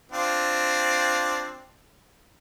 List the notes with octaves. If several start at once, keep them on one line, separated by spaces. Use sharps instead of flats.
C4 D4 F4